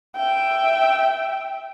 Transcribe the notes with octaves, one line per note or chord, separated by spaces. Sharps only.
E5 G5